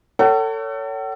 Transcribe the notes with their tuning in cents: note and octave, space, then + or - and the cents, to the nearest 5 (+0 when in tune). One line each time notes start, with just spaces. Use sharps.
A4 +30 C#5 +20 F#5 +45